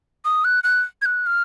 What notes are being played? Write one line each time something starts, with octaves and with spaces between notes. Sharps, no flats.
D#6
F#6
F#6
G#6
F#6
F6